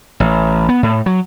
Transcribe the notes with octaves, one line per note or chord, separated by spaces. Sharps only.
A1
B3
A2
F#3